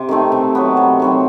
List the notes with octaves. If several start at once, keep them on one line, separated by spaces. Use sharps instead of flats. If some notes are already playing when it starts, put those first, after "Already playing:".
Already playing: C3
D#3 A3 C4
C3
F#3 B3
C3
D#3 F#3 C4